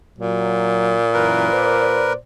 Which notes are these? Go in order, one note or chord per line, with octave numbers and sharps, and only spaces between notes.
A#2 F#3
F#2 E3 A#4 B4
C5 D5